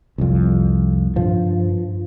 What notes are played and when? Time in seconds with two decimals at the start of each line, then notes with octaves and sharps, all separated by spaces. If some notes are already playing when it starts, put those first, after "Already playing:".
0.18 C2 F2
1.16 G2 F3